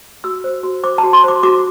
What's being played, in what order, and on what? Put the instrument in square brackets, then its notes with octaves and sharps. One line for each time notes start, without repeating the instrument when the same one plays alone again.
[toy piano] F#4 E6
C5
F#4
C5 D6
A5
F#4
C6
C5 D6
F#4 D6